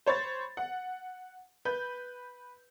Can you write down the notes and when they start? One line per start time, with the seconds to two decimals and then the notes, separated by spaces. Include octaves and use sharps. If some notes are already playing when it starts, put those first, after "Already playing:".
0.06 C5 C#5 B5 A6
0.57 F#5
1.65 B4 G6